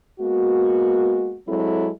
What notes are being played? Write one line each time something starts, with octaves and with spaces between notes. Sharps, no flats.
G#3 A#3 B3 F#4
F#3 G#3 C4 E4 A4